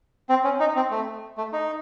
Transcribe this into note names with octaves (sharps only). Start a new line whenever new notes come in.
C4
C#4
D#4
C4
A3
A3
D#4